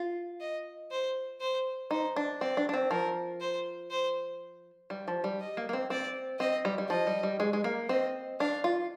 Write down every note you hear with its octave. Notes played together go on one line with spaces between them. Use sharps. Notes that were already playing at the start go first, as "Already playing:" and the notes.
Already playing: F4
D#5
C5
C5
D#4 C5
D4
C4 D5
D4
D4
C4
F3 A#4
C5
C5
G3
F3
G3
D#5
A#3
A#3
C4
C4 D5
C4 D#5
G3
G3
F3 D#5
G3
G3
G#3
G#3
A#3
C4 D#5
D4 F5
F4